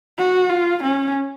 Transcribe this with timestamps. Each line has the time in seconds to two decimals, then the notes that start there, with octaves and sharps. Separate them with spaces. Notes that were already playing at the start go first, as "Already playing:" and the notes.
0.18 F#4
0.50 F4
0.83 C#4